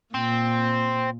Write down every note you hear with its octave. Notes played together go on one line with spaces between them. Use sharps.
A#2 C4